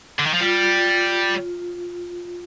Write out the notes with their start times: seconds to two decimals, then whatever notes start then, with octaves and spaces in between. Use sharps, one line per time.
0.19 D3
0.26 D#3
0.34 F3
0.40 G3 F4